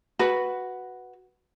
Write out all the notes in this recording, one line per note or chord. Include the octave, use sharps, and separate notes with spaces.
F#4 B4